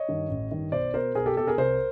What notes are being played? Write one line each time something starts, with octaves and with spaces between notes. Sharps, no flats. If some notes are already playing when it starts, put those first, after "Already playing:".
Already playing: C#5 D#5
G2 D#3
A1
G2 D#3
B1 C5 D5
B2 A#4 C5
B1 G#4 A#4
G4 A4
B2 G4 A4
G#4 A#4
C2 A#4 C5